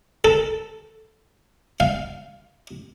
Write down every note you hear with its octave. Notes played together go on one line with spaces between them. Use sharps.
A4
F5